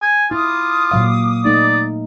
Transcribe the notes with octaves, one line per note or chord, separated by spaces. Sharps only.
G#5
E4 F4 D6 D#6
A#2 F#3 F5
A3 D#4 D5